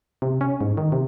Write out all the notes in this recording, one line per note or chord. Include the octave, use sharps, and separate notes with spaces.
C3
C#4
G#2
D#3
C3